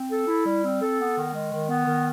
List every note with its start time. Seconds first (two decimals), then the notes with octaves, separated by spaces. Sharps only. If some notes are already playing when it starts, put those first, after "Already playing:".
Already playing: C4
0.10 A4
0.27 E4
0.45 G3
0.64 C4
0.81 A4
0.99 B3
1.17 D#3
1.34 G#3
1.51 D#3
1.69 B3
1.86 D#3